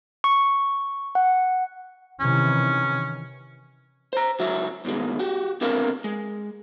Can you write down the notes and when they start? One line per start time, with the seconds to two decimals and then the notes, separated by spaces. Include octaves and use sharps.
0.24 C#6
1.15 F#5
2.20 C3 D#3 E3 C#4
4.13 C5 A#5
4.39 C#2 F#3 F#4 E5
4.85 G2 B2 D#3 G#3
5.19 F#4 G4
5.61 C#2 D3 B3 C4 A#4 F5
6.04 G#3